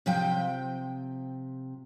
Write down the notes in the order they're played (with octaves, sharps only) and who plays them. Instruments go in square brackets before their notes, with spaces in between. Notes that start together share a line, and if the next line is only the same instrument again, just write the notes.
[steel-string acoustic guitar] C3 F3 G5